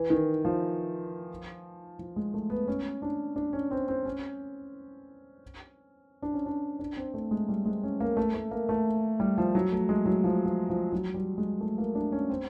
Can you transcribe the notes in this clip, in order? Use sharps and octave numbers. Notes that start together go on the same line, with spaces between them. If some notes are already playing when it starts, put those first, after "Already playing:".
Already playing: E3
D#3
F3
F3
G#3
A3
B3
C#4
D4
D4
C#4
C4
C4
C#4
D4
C#4
D4
D4
C4
A3
G#3
G3
G#3
C#4
A#3
A3
A3
A#3
A3
G3
F3
F#3
A3
G#3
F#3
F3
F3
F3
F#3
G3
G#3
A3
A#3
D4
C#4
C4